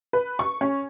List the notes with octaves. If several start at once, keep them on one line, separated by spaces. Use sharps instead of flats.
B4
C#6
C#4